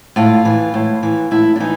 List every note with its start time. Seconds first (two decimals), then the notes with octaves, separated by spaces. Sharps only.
0.16 A2 F4
0.45 E3
0.74 A2
1.03 E3
1.31 A2 E4
1.56 D4
1.60 E3 D#4